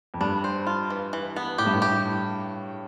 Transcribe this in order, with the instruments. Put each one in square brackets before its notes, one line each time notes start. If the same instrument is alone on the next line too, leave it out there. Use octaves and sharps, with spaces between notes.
[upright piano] F2
[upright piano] G2 [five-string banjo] D4
[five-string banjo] C5
F4
E3
E3
B3
[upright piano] A2 [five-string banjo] G4
[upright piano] G2
A2
[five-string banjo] G4